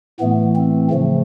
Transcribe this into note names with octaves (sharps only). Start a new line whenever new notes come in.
A2 E3 A3 B3
C4
C#3 F3 A3